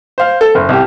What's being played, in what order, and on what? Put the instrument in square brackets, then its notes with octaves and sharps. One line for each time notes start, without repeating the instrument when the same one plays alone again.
[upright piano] C5 F5
A4
F#1
C2 G4